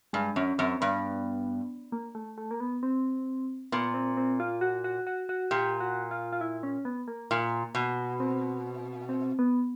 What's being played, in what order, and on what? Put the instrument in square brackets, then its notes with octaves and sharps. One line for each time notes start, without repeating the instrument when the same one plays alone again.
[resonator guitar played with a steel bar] G2 [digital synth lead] G#3
[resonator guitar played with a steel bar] F#2 [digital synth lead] C#4
[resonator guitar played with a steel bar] F#2 [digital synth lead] C4
[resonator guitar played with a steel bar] G2 [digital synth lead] B3
[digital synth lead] A#3
A3
A3
A#3
B3
C4
[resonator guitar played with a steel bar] A#2 [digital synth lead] B3
[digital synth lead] C4
C4
F4
F#4
F#4
F#4
F#4
[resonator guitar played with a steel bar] A#2 [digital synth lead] G4
[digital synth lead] F#4
F4
F4
E4
C#4
B3
A#3
[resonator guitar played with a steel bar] A#2
B2
[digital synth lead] C4
C4
B3